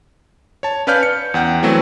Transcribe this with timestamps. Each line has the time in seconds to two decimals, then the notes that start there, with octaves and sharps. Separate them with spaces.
0.63 C#5 A5
0.87 C#4 B4 D5 F5 F6 G6
1.03 C#7
1.34 E2 F#5 G5
1.63 E3 F#3 A3 C4